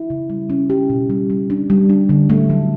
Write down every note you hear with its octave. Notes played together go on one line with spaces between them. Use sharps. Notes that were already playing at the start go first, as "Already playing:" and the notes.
Already playing: E4
C#3
G3
C#4
G4
B2
G3
G3
D4
G3
D4
D3
A3
F#3